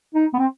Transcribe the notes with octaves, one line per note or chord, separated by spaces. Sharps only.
D#4
B3
C4